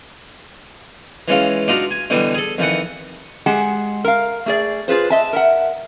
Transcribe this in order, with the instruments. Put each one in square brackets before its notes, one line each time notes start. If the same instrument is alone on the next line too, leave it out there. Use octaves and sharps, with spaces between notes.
[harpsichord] E3 G#3 C#4 F4
D4 D#4 F4 F#4
G#5
B2 D3 E3 G3
G#4 A4
F2 D#3 E3 F#5
[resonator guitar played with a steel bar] G#3 G4 G#4 F#5
A#4 F5
A3 G#4 D5
F4 G#4 B4 C5
D#5 E5 A5
A#4 E5 F#5